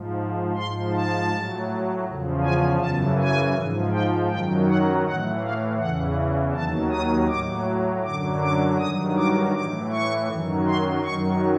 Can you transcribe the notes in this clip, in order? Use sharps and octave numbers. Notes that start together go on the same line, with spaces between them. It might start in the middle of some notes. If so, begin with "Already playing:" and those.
Already playing: G#2 F3
G#2 F3 C6
A5
A2 F#3
E2 C#3 F3
G#5
F#2 C#3 E3 A5
G#5
G#2 F3
G5
F#2 D#3 F#3 G5
F#5
A2 E3 F#5
F5
E2 C#3 E3 F#5
D#2 D#3 F#3 A5
D#6
A2 F#3 D6
F#2 D3 F#3 D6
D6
G2 D#3 F#3 D#6
D6
A2 E3 D6
C#6
F#2 D#3 F#3
C6
F#2 D#3 F#3 C#6